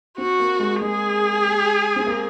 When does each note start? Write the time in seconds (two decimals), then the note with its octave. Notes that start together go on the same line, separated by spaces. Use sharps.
0.18 C4 F#4
0.40 A#3
0.60 G#3
0.81 G#3 G#4
1.96 C4
2.07 A#3